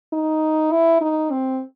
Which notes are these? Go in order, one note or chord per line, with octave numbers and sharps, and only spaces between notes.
D#4
E4
D#4
C4